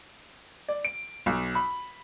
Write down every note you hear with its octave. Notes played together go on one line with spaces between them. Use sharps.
D5
D7
B1
B5